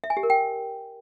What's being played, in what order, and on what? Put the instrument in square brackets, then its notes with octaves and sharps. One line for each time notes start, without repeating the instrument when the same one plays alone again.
[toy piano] E5
G#5
G4
A#4
G5